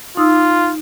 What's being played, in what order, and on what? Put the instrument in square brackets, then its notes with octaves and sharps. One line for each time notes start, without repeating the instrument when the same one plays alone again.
[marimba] D#4 D#6 E6 [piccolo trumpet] F4